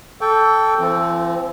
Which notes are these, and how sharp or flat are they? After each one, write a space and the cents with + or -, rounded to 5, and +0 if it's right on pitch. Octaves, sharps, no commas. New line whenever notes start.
A4 +0 G5 +0 C#6 +45
F3 -45 C4 +0